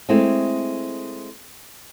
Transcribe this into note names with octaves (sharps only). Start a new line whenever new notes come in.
G#3 A3 C4 E4